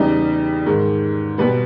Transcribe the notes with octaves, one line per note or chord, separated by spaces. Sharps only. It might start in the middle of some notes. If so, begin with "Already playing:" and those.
Already playing: E2 C#3 G3 D#4 D#5
G#2 D#3 G#3
B2 G3 B3 B4